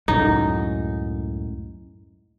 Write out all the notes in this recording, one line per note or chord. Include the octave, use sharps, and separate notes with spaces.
C#2 F#2 A2 D#4